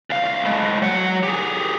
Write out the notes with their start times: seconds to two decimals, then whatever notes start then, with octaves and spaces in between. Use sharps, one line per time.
0.10 C2 F5
0.45 A2 G#3
0.82 F#3 F#5
1.23 G4 G#4